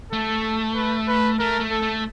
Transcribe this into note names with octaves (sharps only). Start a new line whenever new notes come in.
A3 A4
B4
B4
A3 A#4
A3
A4
A3